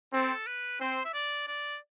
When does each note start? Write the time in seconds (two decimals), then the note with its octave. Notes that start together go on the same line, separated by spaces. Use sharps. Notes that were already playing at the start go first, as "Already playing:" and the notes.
0.13 C4 A4
0.47 B4
0.81 C4 C5
1.05 E5
1.14 D5
1.47 D5